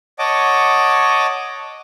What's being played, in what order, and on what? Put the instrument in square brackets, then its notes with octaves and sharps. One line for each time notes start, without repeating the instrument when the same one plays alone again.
[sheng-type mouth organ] C#5 D#5 F#5 A5 D6